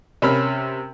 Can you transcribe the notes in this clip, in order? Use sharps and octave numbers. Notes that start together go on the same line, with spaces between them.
C3 C#4 A#4 B5 F6